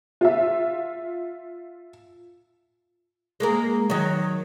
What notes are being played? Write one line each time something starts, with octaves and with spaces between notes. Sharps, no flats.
F4 E5
G#3 A#3 A#4
D#3 F#3